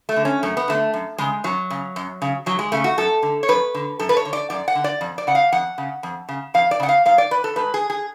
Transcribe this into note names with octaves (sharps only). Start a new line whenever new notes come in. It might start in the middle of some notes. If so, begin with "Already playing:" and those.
A3
D3
C#4
F#2 A3
B3
D3 A3
F#2
C#3 G#3
F#2 F#3
C#3
F#2
C#3
F#2 F#3
G#3
C#3 A3
F#4
F#2 A4
D3
C#5
F#2 B4
D3
F#2 A4
B4
C#5
D3
D5
F#2 D5
F#5
D3
D5
F2
D5
C#3 F#5
F5
F2 F#5
C#3
F2
C#3
F2 F5
D5
C#3 F#5
F5
G#2 F5
D5
B4
A4
G#2 B4
G#4
G#4